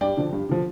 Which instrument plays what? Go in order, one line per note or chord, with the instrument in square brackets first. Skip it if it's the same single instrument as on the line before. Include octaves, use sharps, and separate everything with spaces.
[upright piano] G2 D5 G5
D3 F3
G2
D3 F3